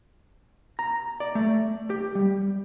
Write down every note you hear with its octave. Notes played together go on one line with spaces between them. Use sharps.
A#5
D5
A3
G4
G3